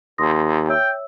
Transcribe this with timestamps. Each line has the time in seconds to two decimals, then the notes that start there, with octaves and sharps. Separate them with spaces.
0.18 D#2 C6 D#6 A#6
0.69 C#5 E5 G5 E6